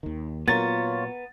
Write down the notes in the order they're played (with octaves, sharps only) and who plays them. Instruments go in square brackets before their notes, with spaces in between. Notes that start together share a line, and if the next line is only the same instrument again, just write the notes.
[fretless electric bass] D#2 D#3
[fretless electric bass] A#2 F#3 [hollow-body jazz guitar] B3 A#4 [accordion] F4 C#5 [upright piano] A6